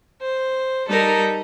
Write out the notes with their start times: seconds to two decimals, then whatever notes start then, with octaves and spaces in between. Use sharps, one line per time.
0.21 C5
0.87 G3 D#4 A4 A#4